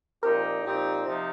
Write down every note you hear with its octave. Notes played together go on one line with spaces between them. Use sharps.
A#2 F3 C4 D#4 G4 A#4
A#2 F3 C4 D#4 G4
C3 F3 D#4